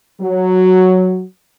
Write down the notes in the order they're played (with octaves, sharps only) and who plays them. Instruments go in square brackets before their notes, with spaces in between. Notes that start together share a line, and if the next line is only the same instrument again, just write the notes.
[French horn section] F#3